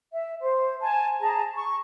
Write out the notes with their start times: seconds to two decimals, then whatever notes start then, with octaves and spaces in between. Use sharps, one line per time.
0.12 E5
0.41 C5
0.81 G#5 A5
1.21 G#4 A5 A#5
1.55 C#6